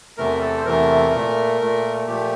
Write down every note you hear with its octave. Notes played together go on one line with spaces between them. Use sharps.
E2 C3 E3 A3 A#4
A4
C5
E2 C3 E3 A3 A#4
A#2 A3
A#2 A3
A#2 F3 A3 G4